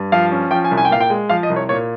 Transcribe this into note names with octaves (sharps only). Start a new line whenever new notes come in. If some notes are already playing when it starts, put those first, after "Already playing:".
Already playing: G2
F3 F5
C#4
F3 G5
G#5
C2
G#5
G5
A#2 F5
G5
G#3
F3 F5
D#5
C2
C#5
A#2 C#5